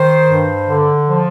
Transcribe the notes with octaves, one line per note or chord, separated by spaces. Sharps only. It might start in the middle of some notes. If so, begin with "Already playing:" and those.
Already playing: D#3 C5
G2
D3
F3